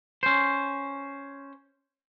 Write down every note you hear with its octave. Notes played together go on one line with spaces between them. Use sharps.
C#4 C5